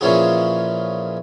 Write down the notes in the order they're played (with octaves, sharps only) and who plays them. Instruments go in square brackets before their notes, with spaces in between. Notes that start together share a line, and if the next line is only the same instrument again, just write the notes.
[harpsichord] A#2 E3 F3 C#4 F4 G#4